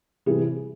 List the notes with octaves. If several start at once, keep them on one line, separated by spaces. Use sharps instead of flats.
C3 E3 G3 G#4